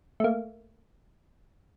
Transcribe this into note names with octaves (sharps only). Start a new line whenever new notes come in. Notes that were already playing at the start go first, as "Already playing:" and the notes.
A3 A#3